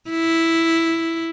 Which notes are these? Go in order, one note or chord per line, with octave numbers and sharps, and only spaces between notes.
E4